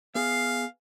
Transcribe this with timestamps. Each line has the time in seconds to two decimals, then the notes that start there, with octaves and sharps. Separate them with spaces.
0.15 B3 G#4 F5